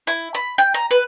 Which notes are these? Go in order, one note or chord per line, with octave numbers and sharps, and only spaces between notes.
E4
B5
G5
A#5
B4